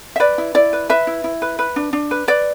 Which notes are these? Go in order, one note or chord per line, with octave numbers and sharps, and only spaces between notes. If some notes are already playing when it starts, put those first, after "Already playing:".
E5
B4 D5
E4
E4 D5
B4
B4 E5
E4
E4
B4
B4
D4
D4
B4
B4 D5